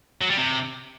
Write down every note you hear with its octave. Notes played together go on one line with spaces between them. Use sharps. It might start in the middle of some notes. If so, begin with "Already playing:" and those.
F#3
G3
C3